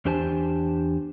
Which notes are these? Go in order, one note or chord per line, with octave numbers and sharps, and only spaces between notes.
E2 D4 G4 C5 G#5 A5